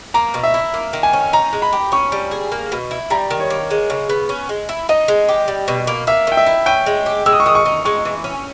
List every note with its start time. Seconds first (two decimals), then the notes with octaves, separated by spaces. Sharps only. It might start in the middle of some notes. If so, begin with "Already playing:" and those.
0.14 A#3 A#5
0.34 B2
0.43 E5
0.54 E4
0.74 A#3
0.93 D#3
1.03 G#5
1.13 C#4
1.33 D#4 A#5
1.53 G#3
1.62 B5
1.73 G4
1.92 C#4 C#6
2.12 G3
2.31 G#4
2.52 A#3
2.72 B2
2.91 E4
3.10 G3 A#5
3.31 D#3
3.40 C#5
3.50 A#3
3.70 G#3
3.90 C#3
4.09 B3
4.29 C#4
4.49 G#3
4.69 E4
4.89 D#4 D#5
5.08 G#3
5.29 G4
5.48 G3
5.68 B2
5.87 A#3
6.07 A#3 E5
6.27 D#3 G5
6.37 E5
6.46 E4
6.66 C#4 G5
6.86 G#3
7.06 G4
7.26 G#3 E6
7.32 D#6
7.40 C#6
7.46 D#3 D#6
7.55 C#6
7.66 D#4
7.85 G#3 C#6
8.05 E3
8.24 C#4